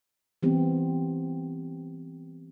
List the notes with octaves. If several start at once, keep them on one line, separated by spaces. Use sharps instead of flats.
E3 G3 B3 C4 G4